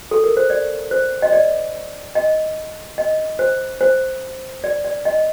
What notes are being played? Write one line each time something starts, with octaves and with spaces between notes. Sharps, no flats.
A4
A#4
C5
D5
C5
D#5
D5
D#5
D#5
C5
C5
D5
D5
D#5